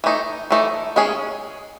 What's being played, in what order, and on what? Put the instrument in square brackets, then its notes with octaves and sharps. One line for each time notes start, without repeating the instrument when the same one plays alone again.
[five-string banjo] E3 A3 D#4
E3 A3 D#4
D#3 G#3 C#4 G#4